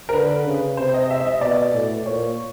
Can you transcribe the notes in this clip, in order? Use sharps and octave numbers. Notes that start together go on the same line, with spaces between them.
A#4
D3 B4
C#3
C3 C5
D#5
E5
E5
D#5
B2 D5
A2
A#2 C#5